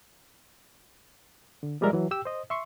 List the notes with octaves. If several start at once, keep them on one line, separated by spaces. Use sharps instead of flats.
D3
F3 G3 G#3 A#4 D5 E5
E3 F#3
G4 G5 E6
C5 D#5
E5 C6 C#6